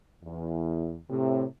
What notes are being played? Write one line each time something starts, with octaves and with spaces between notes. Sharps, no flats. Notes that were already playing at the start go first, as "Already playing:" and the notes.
E2
A2 C3